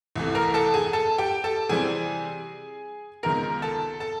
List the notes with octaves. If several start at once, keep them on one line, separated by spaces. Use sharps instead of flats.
C2 C3 E3 A3
A#4 A#5
A4 A5
G#4 G#5
A4 A5
G4 G5
A4 A5
C3 E3 G3 C4 G#4 G#5
C#2 C3 D#3 G#3 B3 A#4 A#5
A4 A5
A4 A5